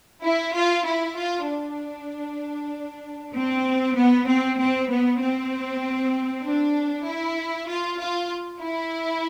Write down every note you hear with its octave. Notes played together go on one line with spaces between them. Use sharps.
E4
F4
E4
F4
D4
C4
B3
C4
C4
B3
C4
D4
E4
F4
F4
E4